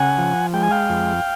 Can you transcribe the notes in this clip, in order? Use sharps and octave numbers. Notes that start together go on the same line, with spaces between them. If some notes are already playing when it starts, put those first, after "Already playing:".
Already playing: C#3 F#5 G#5
F3
G#3 G5
G#5
F5 G5
F2